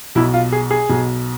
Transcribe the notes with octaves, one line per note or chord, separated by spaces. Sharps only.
B1 B2 E4
F4
G#4
G#4
B1 B2